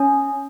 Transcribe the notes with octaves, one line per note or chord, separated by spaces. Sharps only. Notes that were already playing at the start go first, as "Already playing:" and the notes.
Already playing: C#4